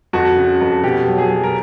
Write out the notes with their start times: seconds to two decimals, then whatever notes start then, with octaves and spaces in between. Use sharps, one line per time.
0.13 F2 F#4
0.36 C#3
0.61 F2
0.83 B2 G4
1.07 F#3
1.18 G#4
1.30 F#3
1.43 A#4